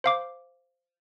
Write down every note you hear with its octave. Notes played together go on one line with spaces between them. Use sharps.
C5 F5 D6